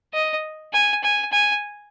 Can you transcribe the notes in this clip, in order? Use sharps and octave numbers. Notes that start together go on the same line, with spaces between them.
D#5
G#5
G#5
G#5